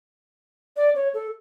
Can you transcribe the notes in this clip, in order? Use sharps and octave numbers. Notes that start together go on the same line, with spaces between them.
D5
C#5
A4